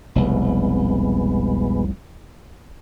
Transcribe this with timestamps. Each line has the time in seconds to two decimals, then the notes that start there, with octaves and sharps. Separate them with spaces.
0.16 F1 C2 B2 G#3 B3